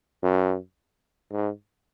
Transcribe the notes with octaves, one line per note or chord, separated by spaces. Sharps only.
F#2
G#2